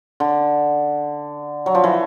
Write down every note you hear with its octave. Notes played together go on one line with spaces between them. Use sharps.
D3
F#3
F3
E3